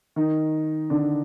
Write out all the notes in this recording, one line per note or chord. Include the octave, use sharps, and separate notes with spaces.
D#3 D#4
D3 D4